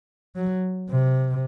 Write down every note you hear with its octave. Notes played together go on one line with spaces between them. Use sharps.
F#3
C3